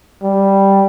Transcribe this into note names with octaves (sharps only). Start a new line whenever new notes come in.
G3